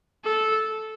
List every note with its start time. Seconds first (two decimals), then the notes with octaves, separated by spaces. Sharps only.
0.24 A4